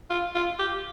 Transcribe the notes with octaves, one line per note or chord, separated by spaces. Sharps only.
F4
F4
G4